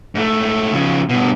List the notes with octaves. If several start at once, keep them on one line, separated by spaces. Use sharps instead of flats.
G#2 A3
C#3 F3
G2 B2